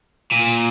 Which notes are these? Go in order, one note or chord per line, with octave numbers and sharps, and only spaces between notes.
A#2